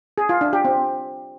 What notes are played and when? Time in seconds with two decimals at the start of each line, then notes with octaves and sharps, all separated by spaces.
0.18 G#4
0.29 F4
0.41 D4
0.53 G4
0.65 C4